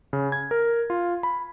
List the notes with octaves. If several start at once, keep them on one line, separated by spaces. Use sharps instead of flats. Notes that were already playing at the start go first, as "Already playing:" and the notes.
C#3
G#6
A#4
F4
B5